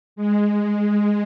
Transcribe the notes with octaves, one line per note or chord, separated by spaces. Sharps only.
G#3